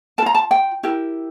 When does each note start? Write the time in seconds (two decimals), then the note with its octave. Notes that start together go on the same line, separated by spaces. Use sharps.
0.18 A#4 A5
0.22 F4 A#5
0.35 A5
0.51 G5
0.83 E4 G4 A#4